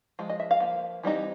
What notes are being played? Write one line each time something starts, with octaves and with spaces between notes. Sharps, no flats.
F3 G#3
D#5
E5
F5
F3 A#3
E3 G3 C4 D#4